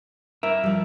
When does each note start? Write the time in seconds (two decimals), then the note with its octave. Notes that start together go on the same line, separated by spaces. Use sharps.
0.43 E4 A#4 E5
0.64 F3 G3